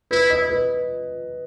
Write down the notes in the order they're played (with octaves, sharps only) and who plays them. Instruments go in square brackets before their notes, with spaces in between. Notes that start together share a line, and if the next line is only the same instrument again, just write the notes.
[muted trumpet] E4 [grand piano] B4
[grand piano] D#5
B4